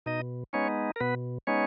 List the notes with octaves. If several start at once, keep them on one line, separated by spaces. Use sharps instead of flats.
B2 D#4 D#5
G#3 B3 C#4 D#4 C#5
A#4
B2 B3 B4
G#3 B3 C#4 D#4 C#5